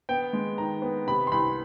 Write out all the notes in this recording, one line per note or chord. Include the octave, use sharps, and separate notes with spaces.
B3 G5
G#3
D#3 A#5
B3
C3 B5
C6
C2 B5